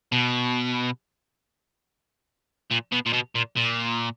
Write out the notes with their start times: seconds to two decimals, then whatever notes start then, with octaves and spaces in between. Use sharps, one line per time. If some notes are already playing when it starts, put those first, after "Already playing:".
0.12 B2
2.71 A#2
2.92 B2
3.06 A#2
3.13 B2
3.35 A#2
3.56 A#2